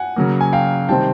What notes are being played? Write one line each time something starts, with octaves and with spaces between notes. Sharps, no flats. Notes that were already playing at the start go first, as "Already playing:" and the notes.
Already playing: F#5 G#5
C#3 F#3 A#3
G#5
F5 G5
C3 D#3 G3 C4 G5 A5